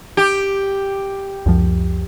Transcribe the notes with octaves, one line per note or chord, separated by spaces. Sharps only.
G4
C#2 F#2 F3